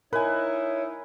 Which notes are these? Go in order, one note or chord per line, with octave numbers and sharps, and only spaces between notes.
D#4 E4 A#4 B4 C#5 G#5